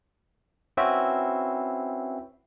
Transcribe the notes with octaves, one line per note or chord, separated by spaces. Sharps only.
C4 C#4 E4 F#4 B4 E5